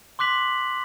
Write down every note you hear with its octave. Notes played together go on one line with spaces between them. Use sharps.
C6 D6 F#6 B6 F#7